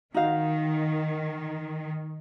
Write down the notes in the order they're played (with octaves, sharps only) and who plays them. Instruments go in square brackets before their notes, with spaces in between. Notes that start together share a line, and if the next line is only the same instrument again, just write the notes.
[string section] D#3 [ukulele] D#4 F#4 F5